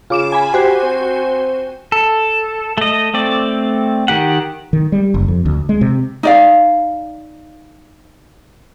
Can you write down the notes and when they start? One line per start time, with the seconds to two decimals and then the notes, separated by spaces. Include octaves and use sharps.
0.10 C#3 F4 D6 E7
0.32 G#5 B5
0.53 F#4 G4 C5 G#5
0.83 C4
1.92 A4
2.78 A3 D#5
3.14 A3 C4 D5
4.08 D#3 G4 F#5
4.73 D#3
4.92 G3
5.14 F#1
5.28 F2
5.46 D2
5.69 G#3
5.81 C3
6.23 D#4 D5 F5